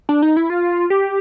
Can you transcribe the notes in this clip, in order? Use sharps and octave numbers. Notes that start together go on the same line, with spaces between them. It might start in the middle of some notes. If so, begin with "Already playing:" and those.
D4
D#4
E4
F4
G4